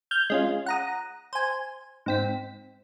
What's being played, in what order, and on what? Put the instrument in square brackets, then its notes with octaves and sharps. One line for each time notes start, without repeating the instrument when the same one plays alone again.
[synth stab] F6 G6 G#6
G#3 C#4 F4
F#5 A#5 D#6
C5 G#5
G#2 C4 B6